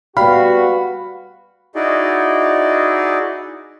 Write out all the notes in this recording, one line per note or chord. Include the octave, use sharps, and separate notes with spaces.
G3 B3 F#4 F5 B5
D#4 E4 F#4 G#4 D5 D#5